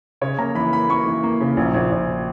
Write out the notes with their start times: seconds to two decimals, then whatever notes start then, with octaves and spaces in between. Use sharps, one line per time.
0.21 C#3 C#5
0.38 A#3 A#5
0.55 E3 B5
0.72 A#3 B5
0.89 A#3 C#6
1.06 E3
1.23 A#3
1.41 C#3
1.57 A#1
1.74 A#1
1.91 A#1